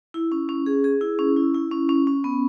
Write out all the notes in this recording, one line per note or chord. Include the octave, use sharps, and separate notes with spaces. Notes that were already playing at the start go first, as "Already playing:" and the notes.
E4
C#4
C#4
G#4
G#4
E4
C#4
E4
E4
C#4
C#4
C#4
B3